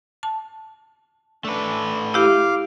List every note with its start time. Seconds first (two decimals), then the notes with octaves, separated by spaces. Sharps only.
0.23 A5
1.45 A3 D4 B4
2.14 E4 G4 F5 D6